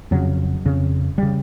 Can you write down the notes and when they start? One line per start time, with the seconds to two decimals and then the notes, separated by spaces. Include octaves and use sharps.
0.11 F2 C#3 F#3
0.65 F2 C#3
1.18 C#3 G3